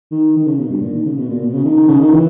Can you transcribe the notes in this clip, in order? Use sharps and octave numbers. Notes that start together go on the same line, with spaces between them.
D#3
D#3
C#3
B2
G2
A#2
D#3
C#3
B2
A#2
B2
C#3
D#3
D#3
C#3
D#3
E3